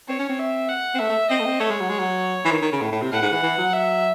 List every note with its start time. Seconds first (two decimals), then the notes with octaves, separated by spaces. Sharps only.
0.08 C4 C#5
0.19 C#4
0.29 C4
0.39 E5
0.69 F#5
0.94 C4
0.99 A3 E5
1.09 A3
1.30 C4 D#5
1.39 A3
1.45 C4
1.60 A3 C#5
1.70 G#3
1.81 F#3
1.89 G#3
1.99 F#3
2.45 E3
2.51 D#3
2.62 D#3
2.72 C#3
2.81 A2
2.92 A2
3.01 C3
3.12 A2 F#5
3.22 G#2
3.32 E3
3.42 E3
3.58 F#3
3.73 E5